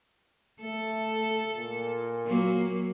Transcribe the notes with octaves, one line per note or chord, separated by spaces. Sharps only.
A3 A4
A#2
F#3 A#3